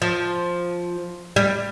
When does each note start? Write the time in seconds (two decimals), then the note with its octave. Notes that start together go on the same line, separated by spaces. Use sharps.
0.02 F3
1.36 G3